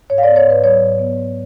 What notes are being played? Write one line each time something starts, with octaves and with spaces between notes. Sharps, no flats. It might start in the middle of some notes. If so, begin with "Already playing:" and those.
G#2 C#5
F5
D5
B3
C#5
G#2 B4
F#3 C#5
G#2
B3
G#2